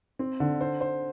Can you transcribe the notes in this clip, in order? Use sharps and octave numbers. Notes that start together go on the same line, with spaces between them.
C4
D3
C5
C5